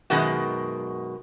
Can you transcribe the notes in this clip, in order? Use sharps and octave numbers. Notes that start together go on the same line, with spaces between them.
F#2 B2 D#3 G#3 F#4